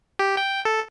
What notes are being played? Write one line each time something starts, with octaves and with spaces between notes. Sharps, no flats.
G4
G5
A4